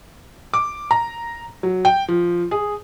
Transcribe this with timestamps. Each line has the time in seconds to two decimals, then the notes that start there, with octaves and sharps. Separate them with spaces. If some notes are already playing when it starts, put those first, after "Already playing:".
0.54 D6
0.91 A#5
1.63 F#3
1.85 G5
2.08 F3
2.51 G#4